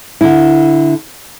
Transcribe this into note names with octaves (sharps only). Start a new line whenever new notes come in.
D3 E4